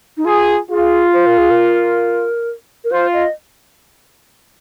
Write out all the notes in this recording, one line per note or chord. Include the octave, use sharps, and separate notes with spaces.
D#4
F4 G#4
F4 G#4
C5
A#4
G#4
A#4
A#4
F4 C5
D#5